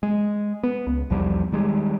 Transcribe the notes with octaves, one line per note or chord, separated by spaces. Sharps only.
G#3
B3
C#2
B1 E2 F3 G3
D#3 G3 G#3